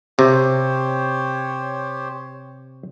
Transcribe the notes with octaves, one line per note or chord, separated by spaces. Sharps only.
C3 G4 C5 C#5